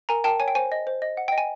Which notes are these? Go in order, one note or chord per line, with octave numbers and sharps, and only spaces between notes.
A#4 G#5 A#5
A#4 G5 A5
C#5 G#5
G5
C5 G#5
D#5
C5
D#5
F#5
D#5 G5
G#5